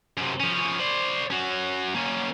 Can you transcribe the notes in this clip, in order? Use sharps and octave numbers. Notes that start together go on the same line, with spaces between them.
F#2 C3
F3 C#4
C5 D5
C#4 F#4
A#3 C#4